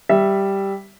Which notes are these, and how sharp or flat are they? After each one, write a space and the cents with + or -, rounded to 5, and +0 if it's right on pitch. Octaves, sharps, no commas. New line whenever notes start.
G3 +0 E5 +0